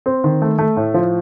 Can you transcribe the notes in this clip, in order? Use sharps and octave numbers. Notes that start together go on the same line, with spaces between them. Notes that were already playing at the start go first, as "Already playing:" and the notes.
C4
D#3
A3
A3
A2
F3